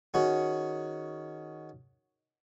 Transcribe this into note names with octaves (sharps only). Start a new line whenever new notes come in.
D#3 C#4 F#4 G#4